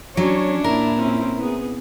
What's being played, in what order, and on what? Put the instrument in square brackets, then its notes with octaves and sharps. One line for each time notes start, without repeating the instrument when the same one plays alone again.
[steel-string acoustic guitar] F#3 [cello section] C#4 C#5 [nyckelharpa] D4
[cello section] A#2 E4 [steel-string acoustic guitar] A#4
[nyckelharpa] C4 C#4
B3 G#4